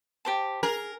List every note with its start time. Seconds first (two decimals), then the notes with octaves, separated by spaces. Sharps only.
0.25 G4 C5 A5
0.63 G#4 A#4